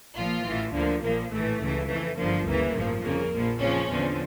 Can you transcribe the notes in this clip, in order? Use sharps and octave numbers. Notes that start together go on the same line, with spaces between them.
A#1 A#2 F3 F4
A1 A2 E3
D2 D3 F3 A#3
A#1 A#2 F3 A#3
A#1 A2 E3 A3
C#2 C#3 E3
F2 E3 A3
G1 G2 D3 F3 A#3
D2 C#3 E3 A#3
A1 G2 F3
G1 F2 C#3 A#3
A#1 A#2 F3
F2 C#3 F3 C#4
E2 D3 F3